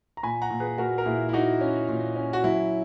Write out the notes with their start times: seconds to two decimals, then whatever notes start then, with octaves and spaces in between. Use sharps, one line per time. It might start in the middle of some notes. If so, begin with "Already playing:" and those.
0.17 A#5
0.23 A#2 G#5 B5
0.42 F#5 A#5
0.50 A#2
0.60 G#4 B4
0.78 A#2 F#4 A#4
0.98 A#4
1.06 A#2 E4 G#4
1.29 E4
1.33 A#3 D#4 F#4
1.61 C#4
1.89 A#2
2.16 C#4
2.33 F#4
2.44 F#3 E4